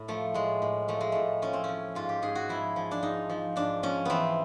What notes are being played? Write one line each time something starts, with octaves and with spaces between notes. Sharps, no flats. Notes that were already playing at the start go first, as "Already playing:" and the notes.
Already playing: A2
F3 A3
A2 G#3
A2
F3 A3
G#3
A2 A3
F3 C#4
C4
F3 C#4
G#2 F4
G4
G#2 G#4
F#4
F3 E4
F3
D4
G#2 D#4
F3
G#2 D4
F3 C#4
E3 B3 C4